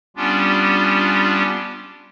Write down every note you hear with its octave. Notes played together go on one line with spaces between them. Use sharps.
G3 B3 C#4 D4 F4 G4